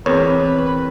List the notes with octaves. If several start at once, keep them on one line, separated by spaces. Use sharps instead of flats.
E2 C4 A#4 B4 C#5